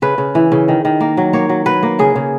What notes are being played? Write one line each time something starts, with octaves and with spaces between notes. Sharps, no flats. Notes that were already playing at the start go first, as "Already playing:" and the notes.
C#3 B4
C#3
E3
C#3
D#3
D#3
A#3
F#3
A#3 C#5
F#3
F#3 B4
A#3
C#3 G#4
C#3